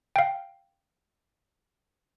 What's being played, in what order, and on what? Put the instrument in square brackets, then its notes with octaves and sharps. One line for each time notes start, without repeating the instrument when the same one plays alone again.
[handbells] F5 G5